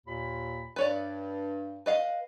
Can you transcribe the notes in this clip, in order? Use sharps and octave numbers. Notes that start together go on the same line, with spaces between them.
D#2 A#2 B5
G2 B4 C#5 D5
B4 D#5 F5